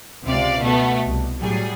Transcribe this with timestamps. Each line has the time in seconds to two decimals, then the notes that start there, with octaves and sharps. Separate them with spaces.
0.25 C#2 C3 D5 F5
0.60 B2 A3 B3
1.05 C2
1.40 A2 F#3 G3 G#4